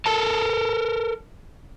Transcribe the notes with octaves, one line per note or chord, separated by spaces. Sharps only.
A4 A#4 A5